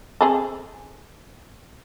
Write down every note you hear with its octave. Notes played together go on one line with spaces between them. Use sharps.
C4 G#4 A4